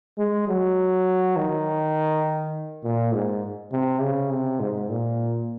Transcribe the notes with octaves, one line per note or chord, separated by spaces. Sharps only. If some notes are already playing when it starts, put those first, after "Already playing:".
G#3
F#3
D#3
A#2
G#2
C3
C#3
C3
G#2
A#2